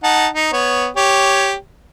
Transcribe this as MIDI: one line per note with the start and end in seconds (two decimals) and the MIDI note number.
0.03 0.27 63
0.03 0.27 78
0.03 0.27 81
0.34 0.49 63
0.53 0.88 59
0.53 0.88 73
0.97 1.54 67
0.97 1.54 73